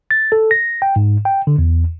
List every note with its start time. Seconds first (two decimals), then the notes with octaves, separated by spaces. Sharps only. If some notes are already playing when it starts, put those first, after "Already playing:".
0.11 A6
0.32 A4
0.51 A#6
0.82 G5
0.96 G#2
1.25 G5
1.47 D3
1.58 E2